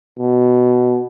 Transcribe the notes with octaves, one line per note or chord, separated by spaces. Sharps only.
B2